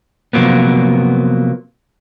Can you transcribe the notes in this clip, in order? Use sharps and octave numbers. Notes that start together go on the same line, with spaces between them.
C3 F3 F#3 A#3 B3